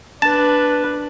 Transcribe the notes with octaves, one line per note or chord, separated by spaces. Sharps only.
D4 B4 A5